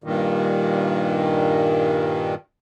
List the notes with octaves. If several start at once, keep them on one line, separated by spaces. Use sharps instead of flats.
G2 A#2 D#3